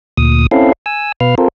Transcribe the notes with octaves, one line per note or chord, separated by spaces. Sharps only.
D2 A#2 D#6
C4 C#4 E4 A4 F5
G#5 E6
B2 B4 F5 F6
C4 F4 A4 A#4